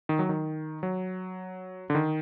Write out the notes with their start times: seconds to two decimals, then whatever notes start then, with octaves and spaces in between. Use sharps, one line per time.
0.09 D#3
0.19 F#3
0.29 D#3
0.83 F#3
1.90 D3
1.95 D#3